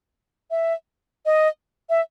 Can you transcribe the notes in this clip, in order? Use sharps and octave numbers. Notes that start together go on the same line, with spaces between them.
E5
D#5
E5